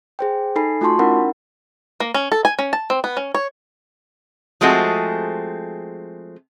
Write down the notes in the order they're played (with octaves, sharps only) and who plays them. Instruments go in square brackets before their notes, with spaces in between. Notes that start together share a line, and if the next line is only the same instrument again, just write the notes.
[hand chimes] G#4 C5 G5
D#4 A4 G#5 B5 C7
A3 F4 F#4 A5 C6 C#6
C#4 D#4 E4 A#4 F#5 B5
[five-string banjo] A#3
C#4
A4
G#5
C#4
A5
C4
B3
C#4
C#5
[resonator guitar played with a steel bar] F3 G#3 A3 C4 F#4 G#4